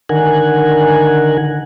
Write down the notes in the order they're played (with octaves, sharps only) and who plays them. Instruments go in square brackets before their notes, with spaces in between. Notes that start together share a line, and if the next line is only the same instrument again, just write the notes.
[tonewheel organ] D3 D#3 A#4 F#5 G#5